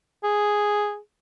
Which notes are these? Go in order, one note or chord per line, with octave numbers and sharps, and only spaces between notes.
G#4